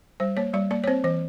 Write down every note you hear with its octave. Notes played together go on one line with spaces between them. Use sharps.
G3 C5
A#3 C#5
G3 D5
A#3 D5
C#5
C4 C5
E3 C5